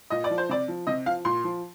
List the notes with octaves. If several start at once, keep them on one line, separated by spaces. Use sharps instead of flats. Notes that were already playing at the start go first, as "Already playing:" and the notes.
A#2 D#5
D5
F3
C5
C3 D5
F3
C3 D#5
F3 F5
A#2 C6
F3